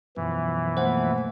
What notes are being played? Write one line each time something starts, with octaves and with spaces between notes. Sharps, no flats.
F#2 B2 E3 F3
A3 A#3 C5 F#5